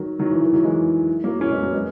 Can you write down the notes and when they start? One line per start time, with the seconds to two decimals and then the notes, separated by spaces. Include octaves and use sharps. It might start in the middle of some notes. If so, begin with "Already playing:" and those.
Already playing: D#3 F#3
0.19 D#3 F#3
0.31 E3
0.41 E3
0.53 D#3 F#3
0.63 E3 G#3
1.24 F#3 A#3
1.40 A#3 C#4
1.51 G#3 B3
1.62 F#3 A#3
1.73 G#3 B3